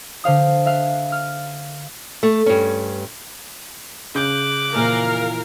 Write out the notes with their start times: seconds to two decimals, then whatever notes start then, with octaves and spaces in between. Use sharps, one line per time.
0.24 D3 C5 F5 D#6
0.66 E5 F5 F#6
1.12 F6
2.23 A3
2.46 G2 C#4
4.15 C#3 D6 F#6 G6
4.73 F2 A#2 E3 A#4 F5